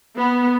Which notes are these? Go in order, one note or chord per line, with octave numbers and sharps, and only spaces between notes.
B3